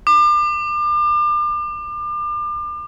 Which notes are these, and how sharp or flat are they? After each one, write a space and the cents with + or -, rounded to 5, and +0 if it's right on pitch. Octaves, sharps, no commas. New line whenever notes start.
D6 +35